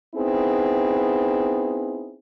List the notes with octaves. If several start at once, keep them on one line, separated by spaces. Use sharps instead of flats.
B3 C4 D#4 E4 G#4